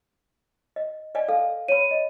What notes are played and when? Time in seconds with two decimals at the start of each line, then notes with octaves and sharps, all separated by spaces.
0.76 D#5
1.15 D5 D#5 G#5
1.29 A4 F5
1.68 C#5 B5 D#7
1.91 D#5